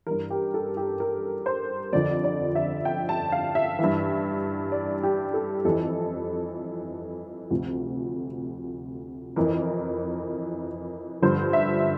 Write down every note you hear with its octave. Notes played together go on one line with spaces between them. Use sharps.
G2 E3 A#4
G4
A4
G4
A#4
C5
F2 D3 F3 D5
D5
E5
G5
A5
F5
E5
G2 E3
D5
G4
A4
F2 E3 A4
D2 C3 F3
F2 E3 A#4
G2 D3 F3 C5
E5